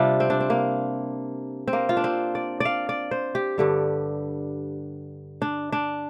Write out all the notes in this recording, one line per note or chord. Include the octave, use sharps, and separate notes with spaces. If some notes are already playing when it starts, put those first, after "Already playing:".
Already playing: C3 G3 D4 F4
C4
D4
C4
A#3
C4
A#3
F4
D4
C4
D5
D5 F5
D5
C5
G4
G2 D3 G3
D4
D4